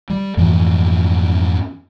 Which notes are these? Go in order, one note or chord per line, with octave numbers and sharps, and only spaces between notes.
G3
F2 G#2 E3 A3